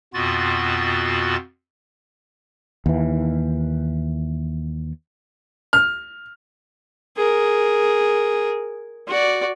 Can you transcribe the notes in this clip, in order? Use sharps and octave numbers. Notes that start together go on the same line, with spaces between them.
F2 B2 B3 F4 F#4 A6
D#2 E3
F6
G#4 A#4
F#4 D5